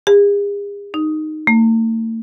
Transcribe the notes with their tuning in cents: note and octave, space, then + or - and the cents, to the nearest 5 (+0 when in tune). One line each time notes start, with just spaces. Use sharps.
G#4 -45
D#4 -10
A3 +45